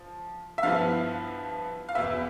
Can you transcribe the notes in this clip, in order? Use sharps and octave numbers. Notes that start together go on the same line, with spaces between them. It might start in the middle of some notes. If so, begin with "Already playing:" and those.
Already playing: F3
E5
G2 F3 B3 E4 F5
F5
E2 B2 B3 E5